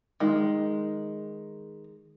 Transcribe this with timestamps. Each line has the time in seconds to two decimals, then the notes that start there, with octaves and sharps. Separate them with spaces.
0.20 D#3 G#3